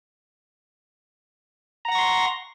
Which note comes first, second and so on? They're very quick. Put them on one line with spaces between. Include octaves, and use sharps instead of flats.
A#5 F#5 A#6 C#6 C6